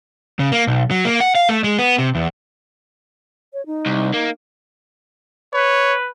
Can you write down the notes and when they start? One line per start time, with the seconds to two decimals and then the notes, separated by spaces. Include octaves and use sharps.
0.39 C#3
0.52 A#3
0.67 B1
0.91 F#3
1.05 A#3
1.20 F#5
1.35 F5
1.49 A3
1.64 G#3
1.79 B3
1.98 C3
2.15 E2
3.53 C#5
3.66 D#4
3.86 C2
4.14 A#3
5.53 B4 C#5